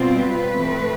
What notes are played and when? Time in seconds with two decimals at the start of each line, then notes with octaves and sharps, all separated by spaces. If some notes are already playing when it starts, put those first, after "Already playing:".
Already playing: B2 G3 C4 F4
0.18 B4
0.52 A2 E3 A3 C4